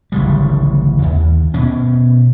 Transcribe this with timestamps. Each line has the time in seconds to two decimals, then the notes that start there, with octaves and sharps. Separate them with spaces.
0.12 D1 A1 C#3 G3
1.02 D#2
1.54 B2 C#4